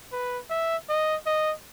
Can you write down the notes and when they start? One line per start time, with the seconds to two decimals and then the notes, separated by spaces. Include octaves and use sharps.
0.12 B4
0.50 E5
0.89 D#5
1.26 D#5